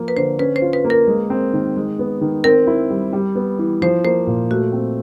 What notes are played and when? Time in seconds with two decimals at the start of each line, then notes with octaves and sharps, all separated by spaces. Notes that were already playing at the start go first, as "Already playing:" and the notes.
Already playing: F3 A#3
0.08 B4
0.16 D3 C5
0.39 C#4 B4
0.56 C5
0.62 F4
0.73 B4
0.85 A#3
0.90 A#4
1.07 G#3
1.30 C4
1.53 D#3
1.76 G#3
1.99 B3
2.21 D#3
2.44 C4 A#4
2.67 E4
2.90 G3
3.13 G3
3.35 B3
3.59 E3
3.82 F3 C5
4.04 A#3 C5
4.27 A#2
4.50 A3 F#4
4.73 C4